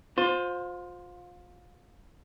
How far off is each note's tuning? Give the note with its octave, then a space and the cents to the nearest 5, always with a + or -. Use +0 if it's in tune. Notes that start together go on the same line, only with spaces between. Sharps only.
F4 +30 C5 +0